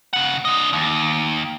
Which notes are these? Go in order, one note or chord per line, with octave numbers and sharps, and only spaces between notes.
C#3 F#5
D4 D#5
D#2